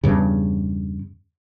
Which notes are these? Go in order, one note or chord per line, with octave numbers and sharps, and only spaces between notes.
E2 G2 C#3